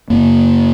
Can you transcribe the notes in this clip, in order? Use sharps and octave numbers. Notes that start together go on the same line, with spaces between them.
F#2 C#3 A#3